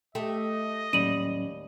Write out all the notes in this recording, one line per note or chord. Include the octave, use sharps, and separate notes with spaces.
A3 G4 D#5
D#2 A2 F#3 G3 C#4 D#7 F#7